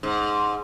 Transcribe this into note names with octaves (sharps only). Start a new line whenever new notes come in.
G#2